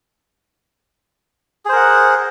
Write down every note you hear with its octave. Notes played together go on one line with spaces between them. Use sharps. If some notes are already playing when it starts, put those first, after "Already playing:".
G#4 A#4 C5 F#5